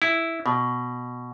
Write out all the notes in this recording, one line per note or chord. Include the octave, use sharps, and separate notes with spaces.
E4
B2